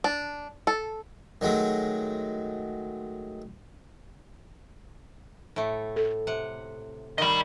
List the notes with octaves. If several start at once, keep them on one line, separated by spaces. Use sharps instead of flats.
D4
A4
D#3 F#3 G#3 A3
A2 A3
A4
C3 F#5
D#3 G3 D#5 B5